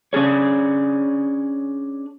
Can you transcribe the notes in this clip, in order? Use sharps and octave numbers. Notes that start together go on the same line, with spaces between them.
C#4 D4 G#4 C#5